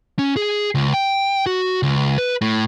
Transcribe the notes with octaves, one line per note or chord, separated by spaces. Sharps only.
C#4
G#4
C#2
G5
F#4
C#2
B4
A2